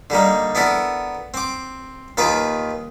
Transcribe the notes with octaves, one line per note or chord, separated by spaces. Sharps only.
D3 G3 A#3 D#4
B3 D4 E4 A4 A#4
C4 D6
D#2 D#3 F4 B4 B5 D6